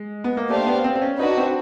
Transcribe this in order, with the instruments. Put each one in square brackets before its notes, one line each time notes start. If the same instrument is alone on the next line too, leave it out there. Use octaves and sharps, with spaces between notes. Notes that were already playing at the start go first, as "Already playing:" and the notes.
Already playing: [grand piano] G#3
B3
A#3
[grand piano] A3 [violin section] D4 G4 C5 F5
[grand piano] B3
C4
C4
C#4
[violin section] D4 F#4 B4 [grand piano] D#4
[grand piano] C4